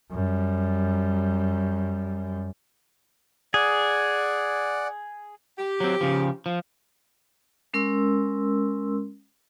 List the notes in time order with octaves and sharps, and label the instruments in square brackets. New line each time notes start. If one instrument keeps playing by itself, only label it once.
[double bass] F#2 G3
[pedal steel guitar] G#4 [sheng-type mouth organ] D5 F#5
[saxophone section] G4
[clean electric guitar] F#3 C4
C#3 F3
F3
[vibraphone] G#3 C#4 A#4 C6 E6